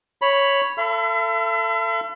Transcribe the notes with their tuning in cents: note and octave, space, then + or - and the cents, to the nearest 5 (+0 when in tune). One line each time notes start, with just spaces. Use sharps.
C#5 +0 B5 +0
A4 +20 E5 +45 B5 +40